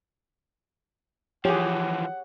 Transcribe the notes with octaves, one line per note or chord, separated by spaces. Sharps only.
E3 F3 G4 G#4 C#5 F#5